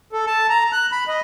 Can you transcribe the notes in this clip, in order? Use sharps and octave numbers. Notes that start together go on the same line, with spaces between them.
A4
A5
A#5
F#6
B5
D#5